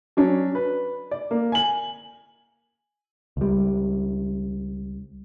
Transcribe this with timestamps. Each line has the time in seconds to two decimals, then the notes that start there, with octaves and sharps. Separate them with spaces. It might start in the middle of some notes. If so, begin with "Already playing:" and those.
0.17 F#3 C#4 D4
0.55 B4
1.11 D5
1.31 A#3
1.52 G#5 F#7
3.37 C#2 G3